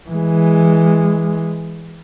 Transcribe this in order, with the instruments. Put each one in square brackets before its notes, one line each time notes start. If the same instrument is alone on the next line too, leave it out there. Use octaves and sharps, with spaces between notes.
[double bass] E3 G#3